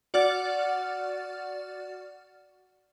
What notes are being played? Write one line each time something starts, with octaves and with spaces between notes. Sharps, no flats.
F#4 D5 F#5 F6 A6